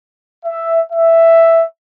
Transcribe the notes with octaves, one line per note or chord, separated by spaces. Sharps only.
E5
E5